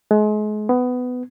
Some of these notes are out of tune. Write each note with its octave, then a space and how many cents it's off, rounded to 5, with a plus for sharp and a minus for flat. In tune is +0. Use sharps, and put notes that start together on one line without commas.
G#3 +35
B3 +15